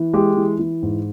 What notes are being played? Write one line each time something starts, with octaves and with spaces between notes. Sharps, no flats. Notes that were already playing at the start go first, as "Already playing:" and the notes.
Already playing: E3
G#3 G4
E3
E3
G#2